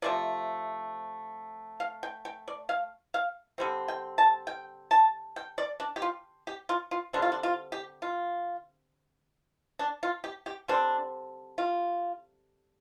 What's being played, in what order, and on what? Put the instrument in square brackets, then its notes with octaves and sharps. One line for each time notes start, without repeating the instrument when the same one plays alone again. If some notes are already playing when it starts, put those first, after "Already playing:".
[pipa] C3 F3 A3 C4 D5
F5
G5
G5
D5
F5
F5
D3 G3 C4
G5
A5
G5
A5
G5
D5
D4
G4
F4
G4
F4
F4
D3 G3 C4 D4
F4
D4
F4
G4
F4
D4
F4
G4
G4
D3 G3 C4 D4
F4